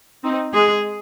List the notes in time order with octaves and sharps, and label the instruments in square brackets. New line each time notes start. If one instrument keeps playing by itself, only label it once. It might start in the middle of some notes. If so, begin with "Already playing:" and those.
[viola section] C4 D#4
[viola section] G#3 [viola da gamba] G#4